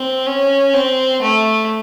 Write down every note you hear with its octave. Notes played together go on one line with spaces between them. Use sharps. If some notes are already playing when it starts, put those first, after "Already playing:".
Already playing: C4
C#4
C4
A3